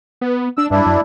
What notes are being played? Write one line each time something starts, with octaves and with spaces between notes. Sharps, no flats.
B3
D4 E6
G2 D4 E4
F#2